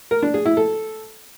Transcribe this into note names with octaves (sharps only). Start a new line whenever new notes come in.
A#4
D4
G#4
E4
A4